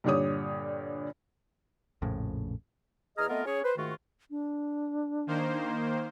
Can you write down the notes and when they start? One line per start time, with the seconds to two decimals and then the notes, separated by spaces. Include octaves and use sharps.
0.04 G2 A#2 D3 G4 C#5 D#6
2.02 A#1 F2 A2 C#3
3.18 E2 G#4 D#5 A#5 F6
3.29 A3 B3 C4 F4 A#4 D#5
3.46 C#4 G#4 C#5
3.64 B4 C5
3.77 G#2 D#3 A3 F4 F#4
4.30 D4
5.27 D#3 A#3 C5